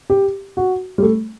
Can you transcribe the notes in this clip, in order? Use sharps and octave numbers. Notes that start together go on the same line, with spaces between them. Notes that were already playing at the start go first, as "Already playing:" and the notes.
G4
F#4
G3
A3